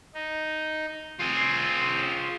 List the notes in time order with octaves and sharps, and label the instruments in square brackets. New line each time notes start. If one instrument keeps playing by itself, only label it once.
[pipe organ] D#4
[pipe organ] C4 [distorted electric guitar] F4 G#4